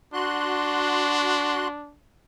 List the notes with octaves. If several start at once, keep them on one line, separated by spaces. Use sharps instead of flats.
D4 F#4 C6 F#6